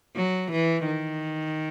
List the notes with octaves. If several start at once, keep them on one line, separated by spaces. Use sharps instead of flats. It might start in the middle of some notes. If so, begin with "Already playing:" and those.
F#3
E3
D#3